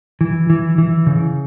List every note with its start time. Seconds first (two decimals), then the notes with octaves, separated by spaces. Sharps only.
0.21 E3
0.50 E3
0.78 E3
1.07 C#3